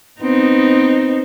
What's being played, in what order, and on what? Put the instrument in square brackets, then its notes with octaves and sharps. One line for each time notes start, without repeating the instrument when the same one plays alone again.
[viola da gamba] B3 C4 D#4